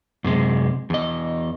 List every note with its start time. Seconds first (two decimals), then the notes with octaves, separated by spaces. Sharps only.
0.24 F#2 C3 G#3
0.90 E2 D#5